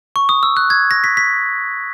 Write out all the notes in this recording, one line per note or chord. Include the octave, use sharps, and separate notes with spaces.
C#6
D#6
E6
F#6
G#6
A#6
B6
B6